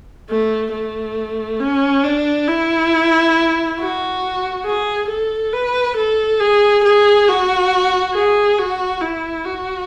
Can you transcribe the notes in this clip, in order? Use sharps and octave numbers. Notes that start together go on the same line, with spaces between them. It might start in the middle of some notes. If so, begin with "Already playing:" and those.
A3
A3
C#4
D4
E4
F#4
G#4
A4
B4
A4
G#4
G#4
F#4
G#4
F#4
E4
F#4